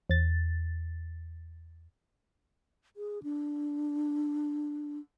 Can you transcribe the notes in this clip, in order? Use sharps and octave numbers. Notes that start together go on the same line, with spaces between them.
E2 A6
G#4
D4